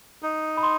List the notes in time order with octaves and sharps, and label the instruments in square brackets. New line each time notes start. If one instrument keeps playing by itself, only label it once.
[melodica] D#4
[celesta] B5
C6